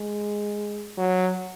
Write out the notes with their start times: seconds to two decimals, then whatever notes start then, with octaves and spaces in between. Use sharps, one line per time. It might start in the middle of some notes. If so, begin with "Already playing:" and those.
Already playing: G#3
0.97 F#3